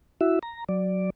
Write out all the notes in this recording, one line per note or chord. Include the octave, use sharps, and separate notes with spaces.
E4 F#4 E5
A#5
F#3 D5